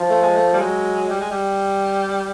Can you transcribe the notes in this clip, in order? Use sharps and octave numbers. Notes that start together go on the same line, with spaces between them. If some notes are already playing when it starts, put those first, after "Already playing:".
Already playing: F3
A3
G#3
A3
G3
F#3 G#3
G3
G#3
G3